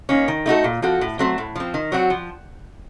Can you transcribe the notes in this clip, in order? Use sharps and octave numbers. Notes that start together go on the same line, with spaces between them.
D#3 A#3 C#4
D#3
A3 D#4 F#4 A4
A#2
F3 C4 F#4 A4
A2
F#3 A3 C4
A2
F3 C4
D#3
F#3 C4 F#4
F3